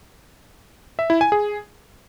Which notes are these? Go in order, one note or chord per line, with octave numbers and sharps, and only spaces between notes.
E5
E4
G#5
G#4